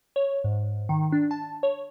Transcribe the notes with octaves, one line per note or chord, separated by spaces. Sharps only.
C#5
G#2
D#3
D4
A5
C#5